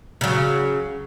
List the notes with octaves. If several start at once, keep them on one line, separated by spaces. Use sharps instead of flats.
C#3 F#3